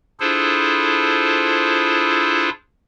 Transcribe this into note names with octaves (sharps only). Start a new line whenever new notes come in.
D4 E4 F4 G#4 A4 C5